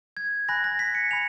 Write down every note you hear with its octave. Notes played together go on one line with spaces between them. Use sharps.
G#6
G#5 B5 F#6 A#6
A#6
B6
C#7
G#5 B5 F7